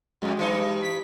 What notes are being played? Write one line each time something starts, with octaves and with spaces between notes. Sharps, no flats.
F2 A2 F#3 G#3
G2 E3 D#4
G#3
B6